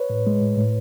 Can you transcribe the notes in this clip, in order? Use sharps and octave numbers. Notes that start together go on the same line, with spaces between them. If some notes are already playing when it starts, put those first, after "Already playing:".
Already playing: B4 C#5
A2
G#3
A2
A2